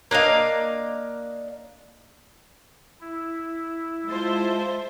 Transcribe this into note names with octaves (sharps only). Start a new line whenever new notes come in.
A#3 D4 D#5 F5
E4
G#3 F4 C5 E5 A5 A6